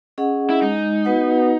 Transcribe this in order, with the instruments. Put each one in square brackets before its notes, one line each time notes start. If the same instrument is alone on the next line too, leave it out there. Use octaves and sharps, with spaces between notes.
[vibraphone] C#4 G#4 D#5 F#5
[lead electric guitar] E4
[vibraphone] G#3 [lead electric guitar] D#4
[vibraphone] B3 F#4 B4 F#5